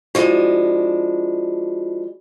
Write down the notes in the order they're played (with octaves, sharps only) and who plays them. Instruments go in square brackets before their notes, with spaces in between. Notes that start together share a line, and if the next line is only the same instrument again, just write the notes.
[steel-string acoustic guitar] F3 G#3 D4 [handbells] E4 F#4